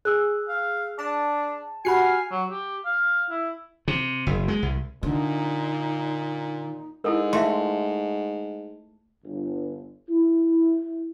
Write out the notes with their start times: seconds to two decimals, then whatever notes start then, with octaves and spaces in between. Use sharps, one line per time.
0.05 G#4 E6 F#6
0.49 F5
0.99 D4 A5
1.85 F#4 G4 F#5 G#5 B5 F6 C7
2.31 F#3
2.51 G4
2.85 F5
3.30 E4
3.88 C3
4.27 F#1
4.48 G#3
4.63 C2
5.03 A#2 D3 D#4
7.04 G#2 E4 A4 A#4
7.33 A3 E5 F5 C6
9.24 G1
10.09 E4